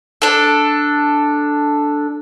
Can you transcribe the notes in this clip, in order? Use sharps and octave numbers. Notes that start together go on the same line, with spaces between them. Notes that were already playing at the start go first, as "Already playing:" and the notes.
D4 A4